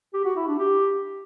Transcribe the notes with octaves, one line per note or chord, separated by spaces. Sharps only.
G4
F#4
E4
D4
G4